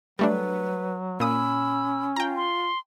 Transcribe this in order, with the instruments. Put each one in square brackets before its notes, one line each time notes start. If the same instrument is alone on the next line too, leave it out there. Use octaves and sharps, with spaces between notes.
[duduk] F#3 [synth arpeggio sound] G3 A3 D4 [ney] B4
[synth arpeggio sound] A#2 D#6 [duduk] C#4 [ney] B5 [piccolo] E6
[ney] F4 [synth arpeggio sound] G5 A#5
[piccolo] C6